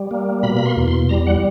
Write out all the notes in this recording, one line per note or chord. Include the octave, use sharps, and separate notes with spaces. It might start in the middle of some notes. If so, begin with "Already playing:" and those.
Already playing: G3
A#3
B2 B5
B5
C6
E2
C6
G3 A#5
F#5